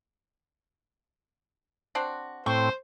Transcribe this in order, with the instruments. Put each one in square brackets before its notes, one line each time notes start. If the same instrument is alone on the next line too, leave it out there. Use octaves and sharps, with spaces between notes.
[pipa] C4 D4 F#4
[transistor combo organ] A2 C4 G5 [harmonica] C5 [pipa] C#6